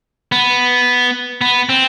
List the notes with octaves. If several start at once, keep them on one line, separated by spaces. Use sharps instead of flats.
B3
B3
C4